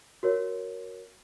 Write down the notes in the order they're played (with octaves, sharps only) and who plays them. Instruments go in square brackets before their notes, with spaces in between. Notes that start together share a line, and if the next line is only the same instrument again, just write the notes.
[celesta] F#4 A#4 C#5